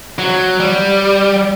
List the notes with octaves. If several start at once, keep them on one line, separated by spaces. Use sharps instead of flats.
F#3
G3